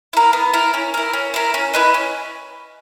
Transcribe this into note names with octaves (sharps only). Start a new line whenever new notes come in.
E4 A#4
B3
E4 A#4
C#4
E4 A#4
C#4
E4 A#4
C#4
E4 B4 D#5
C#4